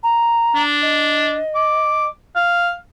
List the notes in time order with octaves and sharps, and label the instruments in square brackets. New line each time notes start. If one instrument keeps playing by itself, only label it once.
[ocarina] A#5
[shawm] D4
[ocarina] D#5
[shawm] D6
F5